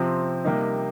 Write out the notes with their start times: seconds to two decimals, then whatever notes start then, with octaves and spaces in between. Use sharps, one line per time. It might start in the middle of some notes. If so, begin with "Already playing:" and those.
Already playing: C3 F3 C4
0.44 C3 G3 A#3 D#4